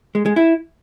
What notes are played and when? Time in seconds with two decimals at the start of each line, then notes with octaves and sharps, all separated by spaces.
0.15 G#3
0.26 G#3
0.36 E4